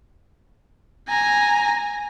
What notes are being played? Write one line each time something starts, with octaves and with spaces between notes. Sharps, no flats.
G#5 A#5